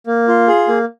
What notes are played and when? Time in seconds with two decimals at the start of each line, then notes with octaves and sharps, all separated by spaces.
0.07 A#3
0.28 F4
0.48 G#4
0.68 A#3